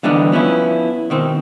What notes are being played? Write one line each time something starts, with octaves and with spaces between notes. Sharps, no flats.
D3 E3 G3 B3 D4 D#4
F3 B3 C#4 E4
B2 D#3 C4